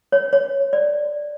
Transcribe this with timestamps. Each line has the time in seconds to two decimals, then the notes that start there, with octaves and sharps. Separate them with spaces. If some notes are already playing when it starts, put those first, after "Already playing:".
0.12 C#5
0.33 C#5
0.73 D5